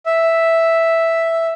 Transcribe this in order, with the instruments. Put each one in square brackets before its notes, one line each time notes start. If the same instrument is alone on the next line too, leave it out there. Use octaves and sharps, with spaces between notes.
[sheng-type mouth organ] E5